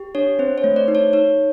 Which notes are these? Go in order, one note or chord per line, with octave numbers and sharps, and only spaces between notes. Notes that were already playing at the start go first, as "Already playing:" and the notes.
Already playing: G4
D4 C#5
C4 C5
C#5
A3
C5 D5
D#4
C#5
D#4 C#5